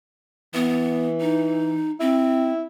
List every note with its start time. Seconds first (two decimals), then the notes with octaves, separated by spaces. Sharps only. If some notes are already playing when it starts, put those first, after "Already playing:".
0.54 E3 B3
1.21 D#4
2.00 C4 E4